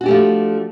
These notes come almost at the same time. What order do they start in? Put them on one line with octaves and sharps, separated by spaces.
F#4 D4 G4 A3 F3